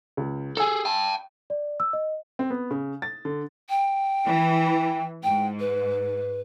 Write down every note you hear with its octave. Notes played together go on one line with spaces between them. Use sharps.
C#2
G#4 A4 G#5 E6
G5 A5
D5
E6
D#5
C4
B3
C#3
A6
D3
G5
E3
G#2 G5
B4